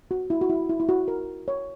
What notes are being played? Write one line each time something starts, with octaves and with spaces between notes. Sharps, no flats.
F#4
E4
F#4
E4
E4
E4
F#4
A#4
C#5